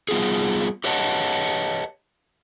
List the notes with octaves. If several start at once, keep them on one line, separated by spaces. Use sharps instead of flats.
G3 B3 F4 G#4
G4 B4 C#5 D#5 F#5 A5